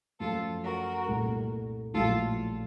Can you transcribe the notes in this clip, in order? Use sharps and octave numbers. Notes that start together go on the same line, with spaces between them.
F#2 F3 A3 F4 A4
F#4 A#4
C2 A#2 A3
A#1 A2 F#3 F4 A4